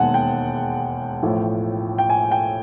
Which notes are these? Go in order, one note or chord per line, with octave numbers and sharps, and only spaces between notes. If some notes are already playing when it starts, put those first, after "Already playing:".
Already playing: E1 D#2 D#3 G#3 F#5 G#5 A5
G5
A1 A2 F3 A3
G5
G#5
G5